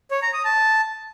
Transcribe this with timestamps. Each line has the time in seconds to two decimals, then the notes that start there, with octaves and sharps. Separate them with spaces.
0.11 C#5
0.22 A#5
0.33 D#6
0.45 A5